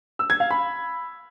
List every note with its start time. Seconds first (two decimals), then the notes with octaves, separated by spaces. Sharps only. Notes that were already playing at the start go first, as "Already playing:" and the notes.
0.19 E6
0.30 G#6
0.40 F5
0.51 B5